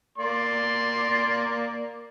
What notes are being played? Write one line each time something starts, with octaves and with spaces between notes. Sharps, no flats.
A#3 D5 C6